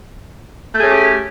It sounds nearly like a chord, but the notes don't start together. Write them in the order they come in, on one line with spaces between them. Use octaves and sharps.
A3 G#4 C#4 G4